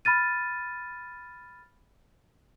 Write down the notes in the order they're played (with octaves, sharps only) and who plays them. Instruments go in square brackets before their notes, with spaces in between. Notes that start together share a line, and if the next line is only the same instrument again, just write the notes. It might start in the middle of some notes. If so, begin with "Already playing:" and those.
[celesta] B5 F6 A6 D#7